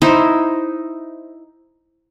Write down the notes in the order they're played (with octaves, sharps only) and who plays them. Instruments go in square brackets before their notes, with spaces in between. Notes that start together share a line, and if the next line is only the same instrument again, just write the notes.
[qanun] D#4 E4 C5